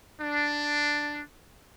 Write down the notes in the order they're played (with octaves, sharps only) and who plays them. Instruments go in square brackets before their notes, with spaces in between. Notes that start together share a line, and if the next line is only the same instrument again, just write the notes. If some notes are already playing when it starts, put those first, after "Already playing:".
[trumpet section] D4